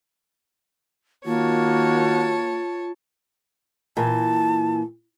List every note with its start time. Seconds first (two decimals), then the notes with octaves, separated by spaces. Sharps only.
1.25 D#3 A#3 F4 F#4 C#5 A5
3.97 A#2 E3 A5